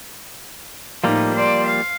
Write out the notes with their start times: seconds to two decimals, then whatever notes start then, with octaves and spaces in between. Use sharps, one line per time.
1.04 A2 F3 G3 A#3 D#4
1.34 C5 D5
1.66 F5